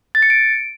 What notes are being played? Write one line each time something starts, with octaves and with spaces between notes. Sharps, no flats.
A6
C#7
D7